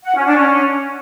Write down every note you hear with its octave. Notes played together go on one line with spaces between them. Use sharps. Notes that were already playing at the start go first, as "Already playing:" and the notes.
F#5
C#4
D4
C#4